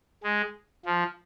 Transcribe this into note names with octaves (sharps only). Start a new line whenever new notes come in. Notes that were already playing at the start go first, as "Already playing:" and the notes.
G#3
F3